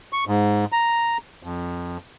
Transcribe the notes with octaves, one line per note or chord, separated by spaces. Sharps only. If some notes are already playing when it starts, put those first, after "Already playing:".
C#6
G#2
A#5
F2